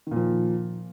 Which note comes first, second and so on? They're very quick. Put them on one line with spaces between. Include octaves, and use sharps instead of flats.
D#3 A#2 F3